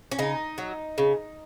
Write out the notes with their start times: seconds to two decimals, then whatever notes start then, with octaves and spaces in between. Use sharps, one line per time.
0.11 C#4
0.19 C#3 D#4
0.58 F#3
0.98 C#3